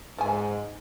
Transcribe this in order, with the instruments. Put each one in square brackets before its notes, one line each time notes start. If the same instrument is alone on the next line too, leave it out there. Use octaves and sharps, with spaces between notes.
[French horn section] G#2 [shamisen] F3 G#5